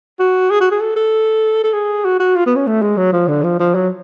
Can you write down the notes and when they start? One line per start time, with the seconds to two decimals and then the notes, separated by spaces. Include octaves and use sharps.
0.20 F#4
0.50 G#4
0.61 F#4
0.71 G#4
0.81 A4
0.96 A4
1.64 A4
1.73 G#4
2.05 F#4
2.20 F#4
2.36 F4
2.46 B3
2.56 C#4
2.67 A3
2.82 G#3
2.97 F#3
3.13 F3
3.28 D3
3.43 F3
3.60 F3
3.75 F#3